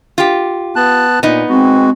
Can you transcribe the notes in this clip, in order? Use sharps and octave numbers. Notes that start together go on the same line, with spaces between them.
F4 G4
B3 A5 F#6
A#2 B3 D#4
G#3 C4 F#4